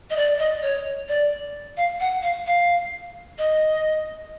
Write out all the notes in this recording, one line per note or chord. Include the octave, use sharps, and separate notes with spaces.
D#5
D5
D#5
C#5
D5
F5
F#5
F5
F5
D#5